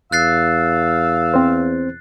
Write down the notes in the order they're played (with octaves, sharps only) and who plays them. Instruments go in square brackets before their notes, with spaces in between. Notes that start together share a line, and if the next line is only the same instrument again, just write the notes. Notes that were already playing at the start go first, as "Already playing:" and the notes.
[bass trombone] E2 [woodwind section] F5 E6 [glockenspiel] F#6 A6 C7
[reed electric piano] C4 C5